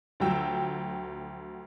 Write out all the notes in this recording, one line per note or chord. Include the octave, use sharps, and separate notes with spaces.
D2 F3 F#3 G5 E6